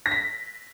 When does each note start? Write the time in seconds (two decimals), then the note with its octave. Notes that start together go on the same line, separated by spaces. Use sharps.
0.06 A#6
0.11 B6